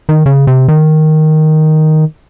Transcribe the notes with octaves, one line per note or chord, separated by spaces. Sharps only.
D#3
C#3
C3
D#3